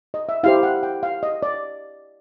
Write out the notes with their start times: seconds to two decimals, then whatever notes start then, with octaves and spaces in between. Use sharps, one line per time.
0.14 D#5
0.29 E5
0.43 E4 G4 C5 F5
0.63 F#5
0.83 G5
1.03 F5
1.23 D#5
1.43 D5